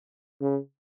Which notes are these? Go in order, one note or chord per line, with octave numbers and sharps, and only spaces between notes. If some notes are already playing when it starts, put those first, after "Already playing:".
C#3